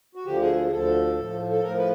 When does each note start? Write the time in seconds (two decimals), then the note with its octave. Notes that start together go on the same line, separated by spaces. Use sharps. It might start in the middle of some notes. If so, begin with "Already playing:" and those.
0.15 F#4
0.26 D2 D3 F3 G4
0.41 G#4
0.56 G#4
0.66 G#4
0.72 D2 D3 F3 A4
1.17 A2 F3
1.50 A4
1.63 A2 F3 A#4
1.78 B4